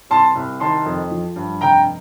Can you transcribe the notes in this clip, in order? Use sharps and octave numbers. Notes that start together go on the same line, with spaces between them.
C2 A5 C6
C2
D#3 A5 C6
F2
F3
G2
F1 G5 A#5